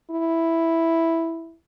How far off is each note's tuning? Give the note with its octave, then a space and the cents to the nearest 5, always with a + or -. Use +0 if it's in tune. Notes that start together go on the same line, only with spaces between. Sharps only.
E4 +0